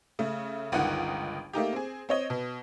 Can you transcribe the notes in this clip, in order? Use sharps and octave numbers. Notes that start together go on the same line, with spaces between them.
C#3 A3
G1 C#2 D#3 D#4 F#5
A3 A#3 D#4 G4
C4 G#4
C4 C#5 D#5
B2